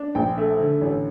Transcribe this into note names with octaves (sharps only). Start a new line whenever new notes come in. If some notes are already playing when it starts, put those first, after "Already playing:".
Already playing: D4
A#1 G5
A3
D3
A1